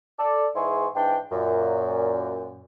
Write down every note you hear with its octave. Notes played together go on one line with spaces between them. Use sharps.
A4 D5
G#2 E3 E4 G#4 C6 C#6
G#2 E3 D4 G5
F#2 A#2